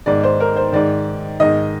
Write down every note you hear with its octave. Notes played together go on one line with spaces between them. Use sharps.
G#2 D#3 D5
C5
A#4
C5
G#2 D#3 D5
G#2 D#3 D#5